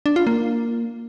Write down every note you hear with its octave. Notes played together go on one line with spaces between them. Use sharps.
D4
F4
A#3